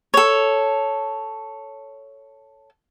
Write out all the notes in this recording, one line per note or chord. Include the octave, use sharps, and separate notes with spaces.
A4 C#5